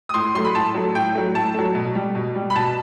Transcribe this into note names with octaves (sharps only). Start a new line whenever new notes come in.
D#6
A2 C6
F#3 A3 C6
B5
A2 A5
F#3 A3
A2 G5
F#3 A3
A2 A5
F#3 A3
B2
G3
B2
G3
B5
B2 A5